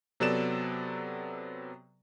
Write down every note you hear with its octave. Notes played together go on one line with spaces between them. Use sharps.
C3 F#3 B3 A4 D5 E7